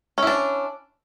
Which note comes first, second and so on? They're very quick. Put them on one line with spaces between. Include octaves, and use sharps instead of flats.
C#4 E4 D4